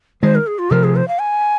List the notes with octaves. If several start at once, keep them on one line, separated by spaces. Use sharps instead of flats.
D#3 G#3 C5
A#4
G#4
F4
C3 F3 A#4
G#4
C5
F5
G#5